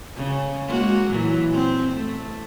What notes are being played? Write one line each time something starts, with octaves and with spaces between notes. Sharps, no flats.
C#3
G#3 A#3 F#4
A#2 E3 F#3
C4
A3